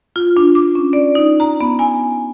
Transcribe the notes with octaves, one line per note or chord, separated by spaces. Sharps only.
F4
D4
D6
C#4
D5
D#4
A#5
B3
G#5